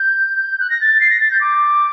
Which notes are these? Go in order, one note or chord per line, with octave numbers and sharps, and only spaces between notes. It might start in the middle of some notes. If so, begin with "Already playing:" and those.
Already playing: G6
F#6
A#6
A6
C7
A#6
A6
G6
D6